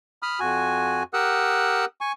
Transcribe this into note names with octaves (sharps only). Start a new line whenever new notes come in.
B5 D#6 F6
F2 F#4 G#5
G4 A#4 F#5 D#6 E6 F#6
G#5 C#6